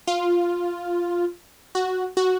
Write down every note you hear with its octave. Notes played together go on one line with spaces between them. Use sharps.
F4
F#4
F#4